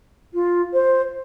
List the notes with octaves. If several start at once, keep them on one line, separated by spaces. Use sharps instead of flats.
F4
C5